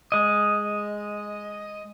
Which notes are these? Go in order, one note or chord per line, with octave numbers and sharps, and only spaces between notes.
G#3 D#5